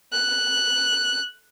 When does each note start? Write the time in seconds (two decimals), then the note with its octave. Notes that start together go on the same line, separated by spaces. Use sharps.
0.13 F#6